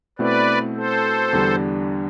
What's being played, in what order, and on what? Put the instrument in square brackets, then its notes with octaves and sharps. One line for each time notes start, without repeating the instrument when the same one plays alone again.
[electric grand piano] B2 A3 C4 E4 [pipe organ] B4 D5
[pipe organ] A4 C5
[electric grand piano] E2 D3 G3 D4